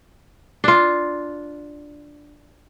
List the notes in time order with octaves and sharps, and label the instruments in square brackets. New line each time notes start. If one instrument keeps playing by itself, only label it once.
[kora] D4 F4